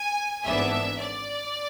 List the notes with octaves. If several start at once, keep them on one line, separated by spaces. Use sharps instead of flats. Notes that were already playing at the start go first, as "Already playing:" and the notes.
Already playing: G#5
G#1 G#2 E3 B3 D4 E5
D5